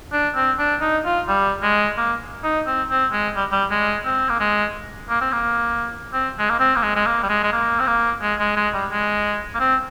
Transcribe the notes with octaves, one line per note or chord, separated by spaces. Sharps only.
D4
C4
D4
D#4
F4
G3
G#3
A#3
D#4
C4
C4
G#3
G3
G3
G#3
C4
A#3
G#3
A#3
C4
A#3
C4
G#3
A#3
C4
A#3
G#3
G#3
A#3
G3
G#3
G#3
A#3
C4
A#3
G#3
G#3
G#3
G3
G#3
A#3
C4